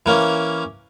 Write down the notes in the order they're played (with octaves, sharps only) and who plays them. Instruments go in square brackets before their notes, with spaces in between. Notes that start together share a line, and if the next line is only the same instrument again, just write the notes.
[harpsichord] E3 A#3 C#4